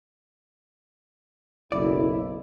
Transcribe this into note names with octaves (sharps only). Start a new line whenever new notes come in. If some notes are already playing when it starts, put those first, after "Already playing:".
F#1 B1 E4 D5